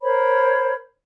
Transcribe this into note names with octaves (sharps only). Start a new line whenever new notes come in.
A#4 C5 C#5 B5